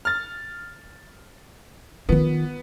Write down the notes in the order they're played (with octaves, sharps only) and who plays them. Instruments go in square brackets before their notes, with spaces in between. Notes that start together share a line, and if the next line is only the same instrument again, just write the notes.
[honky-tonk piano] F6 A6
[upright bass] D#3 F4 [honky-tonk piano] B3